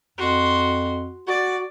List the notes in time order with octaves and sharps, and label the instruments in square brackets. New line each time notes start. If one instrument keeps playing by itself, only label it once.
[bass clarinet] F2 [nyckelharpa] F#4 C6
[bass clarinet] F#4 [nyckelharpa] D5